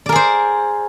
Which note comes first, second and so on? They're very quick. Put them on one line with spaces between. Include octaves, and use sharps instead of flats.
D5 A#4 G#4 C5